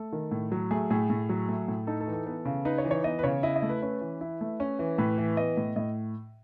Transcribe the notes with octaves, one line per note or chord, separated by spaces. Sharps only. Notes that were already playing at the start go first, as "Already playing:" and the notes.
Already playing: A3 A4
D#3
A2
F#3
A3 G#4
A2 G#4
A2
F#3
A3
A2
D#4 A4
A4
E3
A4
B3 A4
C#3
D#4 B4
C#5
E3
C#5
B3 D#5
B4
C#3 C#5
E4 D#5
D#5
A3
B4
C#4 B4
E3
E4
A3
C#4
E3
A2 B4
E3
B3 D#5
A2
A2 D#5